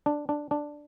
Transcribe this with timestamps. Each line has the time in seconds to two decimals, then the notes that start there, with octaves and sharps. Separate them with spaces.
0.06 D4
0.29 D4
0.51 D4